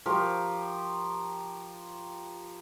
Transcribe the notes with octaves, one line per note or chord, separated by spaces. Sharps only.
F3 G4 A#4 C#6